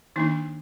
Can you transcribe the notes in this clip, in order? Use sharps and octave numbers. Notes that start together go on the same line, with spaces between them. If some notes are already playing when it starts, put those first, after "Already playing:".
D#3 A#3 D4 D#4